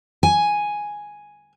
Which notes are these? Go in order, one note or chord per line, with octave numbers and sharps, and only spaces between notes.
G#5